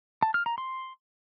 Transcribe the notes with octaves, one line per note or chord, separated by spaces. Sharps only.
A5
F6
A#5
C6